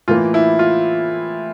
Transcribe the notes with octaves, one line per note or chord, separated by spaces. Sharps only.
A2 E3 A#3 F4
E4
F4